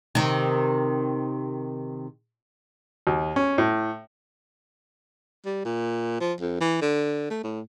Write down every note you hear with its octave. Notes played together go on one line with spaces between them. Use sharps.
C3 D#3
D#2
C#4
A2
G3
A#2
F3
F2
E3
D3
A3
A2